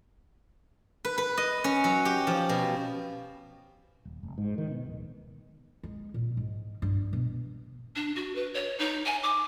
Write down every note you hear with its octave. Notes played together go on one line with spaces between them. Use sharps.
B4
B4
D#5
C#4
F#3
G4
F3
B2
D#1
F1
G#2
D#3
B2
D1
G#3
A#2
G#2
G2
B2
D4
F#4
B4
C#5
D#4
G#5
D6